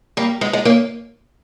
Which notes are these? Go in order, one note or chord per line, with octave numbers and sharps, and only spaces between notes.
G3 A#3
G#3 B3
G#3 B3
A#3 C#4